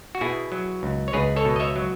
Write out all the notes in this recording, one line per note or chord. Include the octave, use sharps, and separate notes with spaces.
F#4
B2 E4 G#4
F#3
C#2
C#5
C#2 G#4 B4
A4 C#5
B2
D#5
C#5 E5
F#3